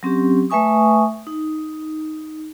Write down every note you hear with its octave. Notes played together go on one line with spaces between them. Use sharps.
F#3 C4 C#4 G4
A3 B4 E5 G#5 C#6 D#6
D#4